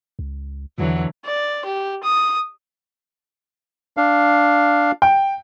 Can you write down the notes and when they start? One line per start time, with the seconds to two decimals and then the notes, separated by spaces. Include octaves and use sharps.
0.19 C#2
0.78 E2 D3 E3 F#3
1.25 D5
1.65 G4
2.03 D#6
3.97 D4 F5
5.02 G5